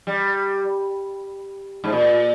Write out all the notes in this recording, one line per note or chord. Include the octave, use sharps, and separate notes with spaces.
G3
G#2
A#2